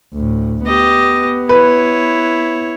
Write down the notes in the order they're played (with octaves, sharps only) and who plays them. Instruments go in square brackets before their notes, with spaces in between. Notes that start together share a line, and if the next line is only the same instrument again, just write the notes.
[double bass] D2 A2
[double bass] B3 [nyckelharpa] G4 D#5
[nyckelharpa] E4 C#5 [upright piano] B4